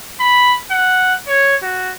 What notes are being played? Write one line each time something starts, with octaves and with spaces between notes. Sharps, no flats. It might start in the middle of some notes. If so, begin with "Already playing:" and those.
B5
F#5
C#5
F#4